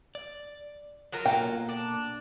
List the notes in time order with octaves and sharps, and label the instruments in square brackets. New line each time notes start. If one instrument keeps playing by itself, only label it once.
[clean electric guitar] D5
[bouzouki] F#3 F4 A#4
[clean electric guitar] B2 A#3 A4 [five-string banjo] G5
[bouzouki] D4